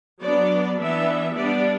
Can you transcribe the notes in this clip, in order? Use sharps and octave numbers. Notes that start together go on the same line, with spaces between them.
F#3 B3 D4 D5
E3 B3 D4 E5
G3 B3 D4 D5